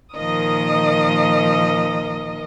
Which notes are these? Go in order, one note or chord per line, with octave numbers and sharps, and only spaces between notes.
A#2 D#3 F3 A#4 D#5 D#6